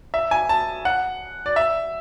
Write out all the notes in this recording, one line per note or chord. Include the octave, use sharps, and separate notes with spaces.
E5
G#5
A5
F#5
D5
E5